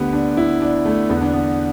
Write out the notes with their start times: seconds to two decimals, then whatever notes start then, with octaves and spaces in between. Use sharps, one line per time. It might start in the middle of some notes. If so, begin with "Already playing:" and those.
Already playing: D2 D3 B3 G4
0.13 D4
0.37 E4
0.62 D4
0.85 A3
1.09 E2 D3 B3
1.21 D4
1.33 B3